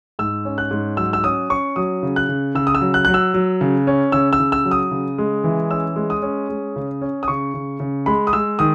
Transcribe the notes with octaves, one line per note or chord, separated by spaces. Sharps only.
G#2 E6
C#4
F#6
G#2
F#3 E6
E6
C#4 D#6
C#4 C#6
F#3 D#6
C#3
F#6
C#3
C#3 E6
D#6
E6
F#3
F#6
F#3 F#6
E6
F#3
C#3
C#4
C#3 E6
E6
C#3
E6
F#3
D#6
C#3
G#3
E3
C#4 E6
G#3
D#6
C#4
G#3
C#3
C#4
D#6
C#3 C#6
C#3
C#3
G#3 B5
D#6
G#3 E6
D#3 D#6